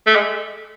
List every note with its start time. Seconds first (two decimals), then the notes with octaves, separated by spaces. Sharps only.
0.07 A3
0.15 G#3